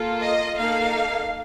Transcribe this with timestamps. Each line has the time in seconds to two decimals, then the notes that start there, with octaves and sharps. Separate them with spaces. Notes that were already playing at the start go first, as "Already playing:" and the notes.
Already playing: A#3 F4 A4
0.21 D#5
0.57 A#3 D#4 A4 F5